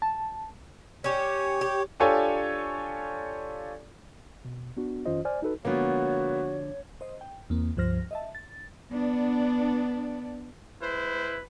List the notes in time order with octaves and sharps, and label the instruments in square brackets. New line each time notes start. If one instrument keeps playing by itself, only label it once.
[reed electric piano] A5
[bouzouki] C#4 G4 [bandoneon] C#5
[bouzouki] G4
[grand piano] D4 F4 G4 A4 C#5 G#5
[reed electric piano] B2
B3 D4 F#4
F2 D#3 C#4 F4 C5 D#5
C5 D5 G#5 F6
D#4 F#4 A4 B4
[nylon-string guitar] D3 F3 G#3 [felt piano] A#3 B3 [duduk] F#4 [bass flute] C#5
[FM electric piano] C5 D#5
G5
E2 A#3 C4
C#2 G2 F3 C5 F6 A#6
D#5 E5 A5
A6
[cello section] B3 D4
[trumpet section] G#3 E4 C5 [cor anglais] B4